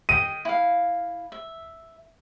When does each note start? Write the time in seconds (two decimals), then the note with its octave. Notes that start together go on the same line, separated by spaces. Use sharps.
0.09 D#5 G5 D#7
0.45 E4 F5
1.32 E5